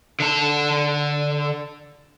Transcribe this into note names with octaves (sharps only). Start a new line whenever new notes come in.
D3 A5